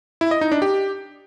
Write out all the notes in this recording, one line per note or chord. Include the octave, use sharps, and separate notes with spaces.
E4
D#5
D#4
D4
G4